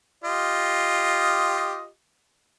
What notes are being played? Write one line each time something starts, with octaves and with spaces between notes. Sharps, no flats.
F4 G4 D#5